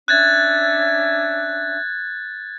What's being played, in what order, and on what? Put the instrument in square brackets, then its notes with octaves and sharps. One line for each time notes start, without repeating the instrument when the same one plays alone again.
[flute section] C#4 D4 E5 [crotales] F#6 G#6 A6